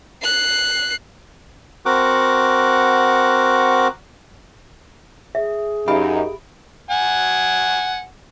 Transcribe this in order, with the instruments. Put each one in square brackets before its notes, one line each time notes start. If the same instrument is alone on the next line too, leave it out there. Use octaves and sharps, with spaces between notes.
[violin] F#6 C7
[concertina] C4 F#4 A#4 F#5 D6
[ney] G#4 [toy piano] E5
[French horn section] F#2 D#4 [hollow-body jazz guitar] G4 F5 [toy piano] E5 B5
[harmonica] F#5 G#5